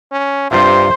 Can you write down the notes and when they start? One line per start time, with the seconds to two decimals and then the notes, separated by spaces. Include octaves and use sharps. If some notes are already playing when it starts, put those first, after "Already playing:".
0.12 C#4
0.51 G2 C3 F4 C5 E5